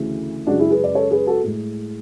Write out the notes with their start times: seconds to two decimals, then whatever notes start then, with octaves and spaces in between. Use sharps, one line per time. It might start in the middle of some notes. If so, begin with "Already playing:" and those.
Already playing: D2 C#3 E3 A3
0.47 F#2 C#3 G#3 D4 F#4
0.59 E4 G#4
0.71 G#4 B4
0.84 B4 D5
0.95 A4 C#5
1.11 G#4 B4
1.27 F#4 A4
1.43 A2 G#3